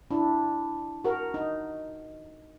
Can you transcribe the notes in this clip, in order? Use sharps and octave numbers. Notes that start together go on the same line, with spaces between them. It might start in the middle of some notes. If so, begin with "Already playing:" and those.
D4 E4
F#4 A#4
D#4